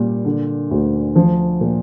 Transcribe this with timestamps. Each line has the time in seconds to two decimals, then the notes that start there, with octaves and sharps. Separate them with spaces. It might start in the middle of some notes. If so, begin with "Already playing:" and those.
Already playing: A#2 G3
0.25 D3
0.71 D2
1.16 F3
1.61 A#2